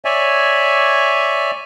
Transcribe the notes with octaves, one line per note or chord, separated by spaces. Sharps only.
C#5 D5 E5 G#5